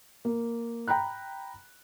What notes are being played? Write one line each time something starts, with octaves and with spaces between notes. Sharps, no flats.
A#3
G5 A#5 B5 F#6